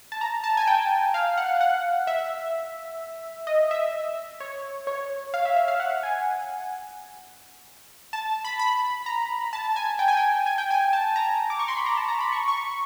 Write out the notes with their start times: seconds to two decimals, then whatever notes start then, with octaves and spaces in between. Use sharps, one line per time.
0.12 A5
0.21 A#5
0.44 A5
0.57 G#5
0.67 G5
1.14 F5
1.37 F#5
1.61 F#5
2.07 E5
3.47 D#5
3.71 E5
4.40 C#5
4.87 C#5
5.34 F5
5.45 E5
5.56 E5
5.68 F5
5.80 F#5
6.03 G#5
8.13 A5
8.44 B5
8.59 B5
9.06 A#5
9.53 A5
9.76 G#5
9.99 G5
10.08 G#5
10.17 G5
10.46 G#5
10.58 G5
10.71 G#5
10.93 A5
11.16 A#5
11.50 D6
11.59 C#6
11.68 C6
11.77 B5
11.86 A#5
11.97 A5
12.08 A#5
12.20 B5
12.32 C#6
12.48 C#6